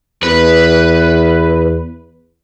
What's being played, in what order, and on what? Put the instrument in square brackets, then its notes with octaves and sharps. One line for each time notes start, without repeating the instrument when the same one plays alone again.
[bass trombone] E2 [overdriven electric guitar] B4